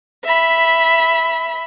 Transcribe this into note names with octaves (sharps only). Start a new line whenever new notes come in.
E5 B5